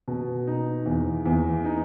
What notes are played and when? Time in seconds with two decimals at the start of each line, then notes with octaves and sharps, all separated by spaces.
0.08 B2
0.47 D#4
0.86 E2
1.26 E2
1.65 D#4